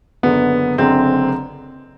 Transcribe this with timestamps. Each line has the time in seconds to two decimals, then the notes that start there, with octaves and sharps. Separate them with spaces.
0.23 F#1 F#2 D3 B3
0.78 F#1 F#2 D3 C4